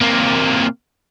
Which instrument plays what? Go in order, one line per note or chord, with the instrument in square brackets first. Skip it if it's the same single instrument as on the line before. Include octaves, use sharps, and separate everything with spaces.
[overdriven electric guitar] C3 A#3